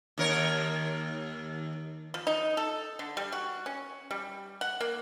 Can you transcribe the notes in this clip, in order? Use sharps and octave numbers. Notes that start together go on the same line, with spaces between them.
D#2 A#4 C#5
F3
D#4
A4
D3
G3
F#4
C#4
G3
F#5
A#3